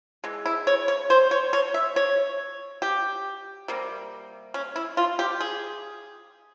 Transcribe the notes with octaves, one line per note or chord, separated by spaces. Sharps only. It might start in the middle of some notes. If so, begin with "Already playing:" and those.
E3 G#3
E4
C#5
C#5
C5
C#5
C#5
E5
C#5
G4
C3 G3 A#3
C#4
E4
F4
G4
G#4